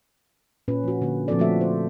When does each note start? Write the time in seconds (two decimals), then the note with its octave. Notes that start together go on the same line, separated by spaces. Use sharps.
0.68 A#2 C#4 B4
0.84 F3 F#4
1.02 D3 A#3
1.28 A#2 F3 C4 F#4 A4 D5
1.39 F3 A3 F#4 A4 E5
1.61 C5